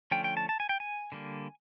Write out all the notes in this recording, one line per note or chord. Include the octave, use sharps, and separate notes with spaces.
D3 F3 A3 C#4 G5
G5
A5
A5
G#5
G5
G#5
D3 G3 A#3